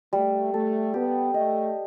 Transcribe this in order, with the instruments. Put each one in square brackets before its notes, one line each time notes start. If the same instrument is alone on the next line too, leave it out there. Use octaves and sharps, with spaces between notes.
[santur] G3 [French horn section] A3
[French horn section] A3 [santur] A4
[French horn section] B3 [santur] G4
[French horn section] A3 [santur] D#5